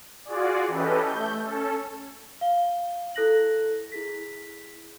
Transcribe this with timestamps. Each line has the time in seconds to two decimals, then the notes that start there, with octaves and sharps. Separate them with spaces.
0.25 F4 F#4 G#4 D5
0.68 E3 C#4 G4 A4 B4 D#5
1.04 A3 G6
1.41 C#4 A4
2.41 F5 G7
3.15 E4 A4 F#6 A#6 F#7
3.92 E4 G#4 B6